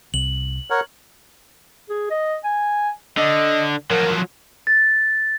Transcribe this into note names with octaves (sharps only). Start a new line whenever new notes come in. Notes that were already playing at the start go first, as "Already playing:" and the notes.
C2 F#7
A#4 C#5 F#5
G#4
D#5
G#5
D3 D#5
F3 F#3 A#4
A6